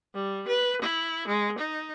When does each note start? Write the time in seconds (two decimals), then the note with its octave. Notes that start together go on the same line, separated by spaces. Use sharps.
0.15 G3
0.48 B4
0.81 E4
1.28 G#3
1.58 D#4